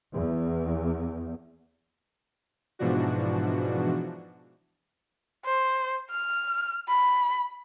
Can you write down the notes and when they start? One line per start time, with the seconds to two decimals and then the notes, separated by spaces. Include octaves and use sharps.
0.14 E2
2.79 G#2 B2 E3 F3 D4 F#4
5.45 C5
6.11 F6
6.88 B5